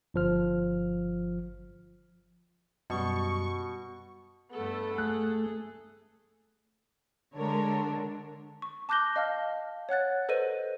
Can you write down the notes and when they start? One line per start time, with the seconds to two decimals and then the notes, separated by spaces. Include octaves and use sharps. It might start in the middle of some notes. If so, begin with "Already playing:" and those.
0.14 G1 F3 F6
2.90 F#2 B2 G3 C#6
4.53 G2 A3 B3 A4
4.98 A3 G#4 F#6
7.35 D3 G#3 D4 A#4 C#5
8.62 C#6
8.89 A5 D6 F#6 G6 A#6 G7
9.16 D#5 F5 A5 F6
9.89 C#5 F#5 F#6 A6
10.29 A4 B4 C5 D#5 D#7